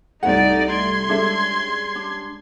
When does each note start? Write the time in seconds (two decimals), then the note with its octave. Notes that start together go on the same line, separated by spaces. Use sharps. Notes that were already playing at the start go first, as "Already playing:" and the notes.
0.23 C2 A3 D#4 C5 D5 F#5
0.73 C6 G#6
1.09 G3 G#3 C#4 D4 A4 E5
1.95 D4